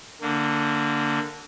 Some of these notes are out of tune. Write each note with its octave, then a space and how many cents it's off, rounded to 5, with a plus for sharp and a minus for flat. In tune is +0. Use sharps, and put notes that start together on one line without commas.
D3 +0 A#3 -25